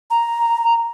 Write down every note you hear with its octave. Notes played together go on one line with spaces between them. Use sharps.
A#5